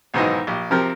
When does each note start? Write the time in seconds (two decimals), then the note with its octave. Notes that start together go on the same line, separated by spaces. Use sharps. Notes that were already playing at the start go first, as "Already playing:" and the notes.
0.14 B1 G#2 D#3 E3 C5 D#5
0.47 A#1 G4
0.71 C3 F3 C4 G4 A#4